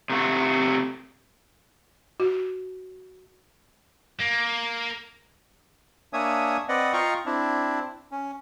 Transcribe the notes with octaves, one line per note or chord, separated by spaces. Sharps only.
C3 A3 F#4
F#4
A#3
A#3 D4 C#5 E5 G#5 D#6
C4 B4 D5 D#5 F#5
F4 D#5 F5 G5 A#5 C#6
C4 D4 E4
C#4